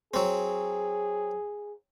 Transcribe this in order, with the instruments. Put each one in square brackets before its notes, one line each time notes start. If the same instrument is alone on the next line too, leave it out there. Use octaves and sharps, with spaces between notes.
[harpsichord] F#3 C4 [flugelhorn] G#4